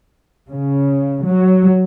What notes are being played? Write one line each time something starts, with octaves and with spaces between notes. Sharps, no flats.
C#3
F#3